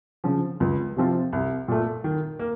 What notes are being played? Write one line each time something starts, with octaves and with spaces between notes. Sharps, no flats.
C#3 F3
C#2
C3 F3 C4 F4
C2
A#2 A3
D#3
A#3